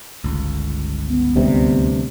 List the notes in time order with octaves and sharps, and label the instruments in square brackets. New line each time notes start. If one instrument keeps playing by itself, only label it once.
[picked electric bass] G1 C#2
[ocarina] B3
[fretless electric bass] D2 G2 C3